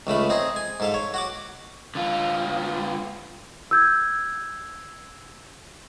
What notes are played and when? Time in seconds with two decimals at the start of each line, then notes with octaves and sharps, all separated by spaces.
0.07 C#2 C#3 A3 B5
0.30 C4 D#4 G#4
0.56 G#5
0.80 G#2 A4 F5
0.94 C#5
1.14 F#4 F#5 D6
1.95 D3 F4
3.71 E6 G6 G#6